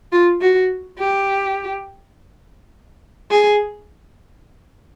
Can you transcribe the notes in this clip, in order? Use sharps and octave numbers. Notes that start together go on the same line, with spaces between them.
F4
F#4
G4
G#4